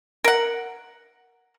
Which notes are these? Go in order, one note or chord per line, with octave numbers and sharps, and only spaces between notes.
A#4 F#5